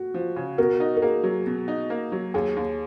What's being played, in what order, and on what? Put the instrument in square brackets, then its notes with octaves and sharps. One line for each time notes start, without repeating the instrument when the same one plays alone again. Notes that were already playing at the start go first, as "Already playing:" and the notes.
Already playing: [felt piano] F#4
[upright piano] F3
C#3
[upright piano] B2 [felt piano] F#4 A#4
[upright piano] D#4
[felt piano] A#4
[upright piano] A#3 [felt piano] G#4
[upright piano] F#3
B2
D#4
A#3
F#3
[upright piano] D#2 [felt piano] G#4
[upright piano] D#2